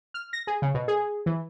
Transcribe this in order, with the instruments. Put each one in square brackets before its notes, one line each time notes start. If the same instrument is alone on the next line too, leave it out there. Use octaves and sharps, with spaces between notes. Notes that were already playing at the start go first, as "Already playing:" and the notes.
[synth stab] F6
A#6
G#4
C#3
B2
G#4
E3